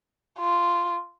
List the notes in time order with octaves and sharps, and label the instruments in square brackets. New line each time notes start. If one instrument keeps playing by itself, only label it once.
[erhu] F4